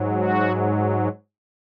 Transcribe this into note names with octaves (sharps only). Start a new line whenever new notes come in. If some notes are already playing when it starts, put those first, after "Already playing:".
Already playing: G#2 F#3
F#4